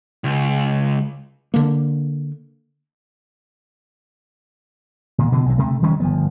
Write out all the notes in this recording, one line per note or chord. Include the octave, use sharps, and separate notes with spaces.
C#2
D3 A#3
A#2 D#3
B2 D3 F3
B1 C3 D#3
D2 C3 A3
D#3 F3 G3 C#4
G1 F3 B3